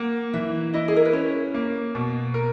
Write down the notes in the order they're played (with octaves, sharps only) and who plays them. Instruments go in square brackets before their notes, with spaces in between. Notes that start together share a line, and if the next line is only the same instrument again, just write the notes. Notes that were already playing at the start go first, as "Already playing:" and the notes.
Already playing: [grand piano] A#3 [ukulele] F#5
[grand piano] E3 [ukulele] E5
[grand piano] E4 [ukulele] D#5
[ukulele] G#4
A#4
B4
[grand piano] C#4 [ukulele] C#5
[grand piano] A#3
B2
A#4